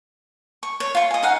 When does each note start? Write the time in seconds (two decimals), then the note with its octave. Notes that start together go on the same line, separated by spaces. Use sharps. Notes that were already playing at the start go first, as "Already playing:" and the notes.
0.63 C#6
0.80 C#5
0.95 F4 C#6
1.11 D#5 G#5
1.23 D#4 F5 F#5